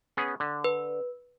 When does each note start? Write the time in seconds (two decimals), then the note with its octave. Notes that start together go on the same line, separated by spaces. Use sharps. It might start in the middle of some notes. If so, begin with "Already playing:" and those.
0.17 B3 C#4 G#4
0.40 D3
0.64 B4